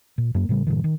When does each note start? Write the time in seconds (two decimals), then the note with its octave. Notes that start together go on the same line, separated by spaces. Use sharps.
0.18 A#2
0.35 F#2 A#3
0.49 A2 C#3 G3
0.67 G2 A#2 D3 E3
0.84 D#3